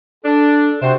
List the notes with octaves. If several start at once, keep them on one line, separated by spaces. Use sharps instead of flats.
D4 A4
C3 C4 F#4 C5